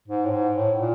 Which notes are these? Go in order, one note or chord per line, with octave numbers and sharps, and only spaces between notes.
G#2
A2
G#2
A2
A#2